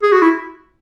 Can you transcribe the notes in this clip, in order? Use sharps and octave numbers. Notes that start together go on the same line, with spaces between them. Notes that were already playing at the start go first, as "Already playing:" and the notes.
G#4
F#4
E4